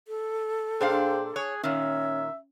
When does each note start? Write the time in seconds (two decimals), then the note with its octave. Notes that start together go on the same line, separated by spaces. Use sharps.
0.08 A4
0.81 A#2 D4 G#4 C5 F5 G5 C6
1.36 G#4 C#5 F#6
1.64 A#2 D#3 C#4 C#5 E5